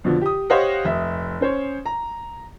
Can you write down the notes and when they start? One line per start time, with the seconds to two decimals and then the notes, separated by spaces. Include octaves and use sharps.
0.04 F2 B2 D3 F3
0.21 G4 D#6
0.50 G4 C5 C#5 D#5 F5 F#5
0.85 F1 E5
1.41 C#4 C5 C#5
1.86 A#5